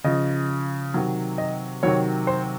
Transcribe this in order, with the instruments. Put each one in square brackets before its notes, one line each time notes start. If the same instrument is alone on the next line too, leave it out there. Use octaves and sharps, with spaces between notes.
[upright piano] C#3 F3 D#5
C3 D#3 F#3
D#5
C3 D#3 F#3 C#5
C5